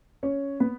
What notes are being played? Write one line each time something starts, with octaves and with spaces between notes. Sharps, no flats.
C#4 C#5
B3 B4